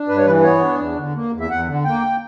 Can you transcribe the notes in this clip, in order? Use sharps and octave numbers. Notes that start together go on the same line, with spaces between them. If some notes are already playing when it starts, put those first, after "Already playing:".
Already playing: D4
G2 B4
C#5
E3 B4
B3 C#5
D4
E2
D3
A#3
E2
E5
E2 F#5
D3
A#3 G5